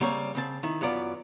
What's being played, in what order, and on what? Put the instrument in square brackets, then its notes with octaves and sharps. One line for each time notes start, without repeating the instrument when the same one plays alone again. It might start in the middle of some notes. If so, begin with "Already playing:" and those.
[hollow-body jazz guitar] C#3 G3 A#3 C4 C#5
C#3 C4 A5
D#3 E4
F#2 F#3 B3 F4 D5